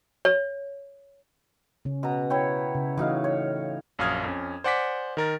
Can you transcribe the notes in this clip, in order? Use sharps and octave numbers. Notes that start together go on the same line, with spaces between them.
C#5
C#3 C#4
B2 A#5
E4 C#5 G5
C#3
A2 E3 D#4 F#4 D#5 F5
C#5
A#1 F#2 F5 D#6 F6 G#6
F2 C#4
C5 D5 F#5 G#5 D6 B6
D#3 A#4 A6